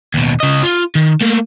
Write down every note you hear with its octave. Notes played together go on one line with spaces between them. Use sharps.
D#2 B2
C#3 D#5
F4
D#3
A3 A#3